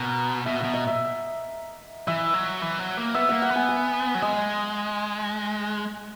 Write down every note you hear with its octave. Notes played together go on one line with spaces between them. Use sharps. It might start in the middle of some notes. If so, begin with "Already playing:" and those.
Already playing: B2 A#4
B2 E5
B2 F#5
D#5
E5
E3 E5
F#3
E3
F#3
A#3
B3 E5
A#3 F#5
F#5
B3
G#5
G#5
F#3
G#3 D#5